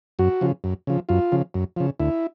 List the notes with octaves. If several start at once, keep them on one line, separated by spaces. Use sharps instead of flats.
F#2 F#4
C#3 F3
F#2
C#3 F3
F#2 F4
C#3 F3
F#2
C#3 F3
D2 E4